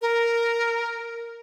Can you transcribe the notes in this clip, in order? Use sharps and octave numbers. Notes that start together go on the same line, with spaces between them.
A#4